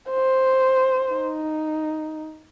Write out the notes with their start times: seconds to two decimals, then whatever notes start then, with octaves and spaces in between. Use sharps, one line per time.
0.10 C5
1.13 D#4